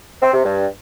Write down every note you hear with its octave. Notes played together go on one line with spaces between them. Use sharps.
C4
C3
G2